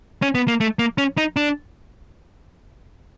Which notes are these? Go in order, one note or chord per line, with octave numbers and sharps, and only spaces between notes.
C#4
B3
A#3
A3
A#3
C#4
D#4
D4